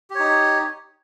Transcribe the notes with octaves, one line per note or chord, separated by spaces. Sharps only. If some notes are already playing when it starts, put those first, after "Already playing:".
D#4 G4 C#5